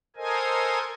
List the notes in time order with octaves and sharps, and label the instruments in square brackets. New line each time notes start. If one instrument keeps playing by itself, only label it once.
[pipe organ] A4 A#4 C5 D#5 G#5